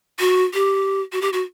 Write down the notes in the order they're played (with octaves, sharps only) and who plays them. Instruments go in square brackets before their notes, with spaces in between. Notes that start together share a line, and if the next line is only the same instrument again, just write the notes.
[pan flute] F#4
G4
F#4
G4
F#4